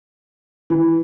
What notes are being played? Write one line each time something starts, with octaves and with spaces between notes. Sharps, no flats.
E3